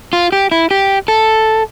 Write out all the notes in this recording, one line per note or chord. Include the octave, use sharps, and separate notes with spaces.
F4
G4
E4
G4
A4